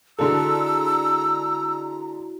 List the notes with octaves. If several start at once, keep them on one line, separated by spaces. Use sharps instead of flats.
D3 G#3 E4 F#4 A4 A#5 E6